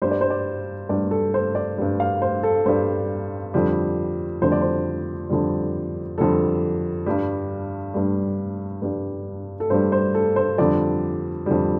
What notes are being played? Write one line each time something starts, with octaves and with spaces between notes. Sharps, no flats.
G2 G3 C5
D5
C5
D5
G2 G3 D5
A4
C5
D5
G2 G3
F5
C5
A4
G2 G3 C5
F2 D3 G3
F2 D3 G3 C5
D5
C5
F2 D3 G3
F2 D3 G3 A4
G2 G3
G2 G3
G2 G3
A4
G2 G3 C5
C5
A4
C5
F2 D3 G3 D5
F2 D3 G3